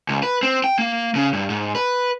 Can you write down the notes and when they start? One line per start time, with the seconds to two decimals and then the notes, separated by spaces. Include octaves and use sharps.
0.09 C#2
0.23 B4
0.43 C4
0.64 G5
0.79 A#3
1.15 C#3
1.33 G2
1.50 G#2
1.75 B4